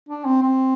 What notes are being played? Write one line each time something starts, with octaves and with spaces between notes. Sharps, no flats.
D4
C4
C4